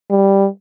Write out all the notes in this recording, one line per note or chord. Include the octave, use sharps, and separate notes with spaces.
G3